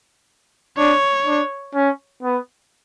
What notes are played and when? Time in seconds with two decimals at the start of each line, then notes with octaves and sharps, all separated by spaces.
0.78 D4 C#5
1.26 D4
1.75 C#4
2.23 B3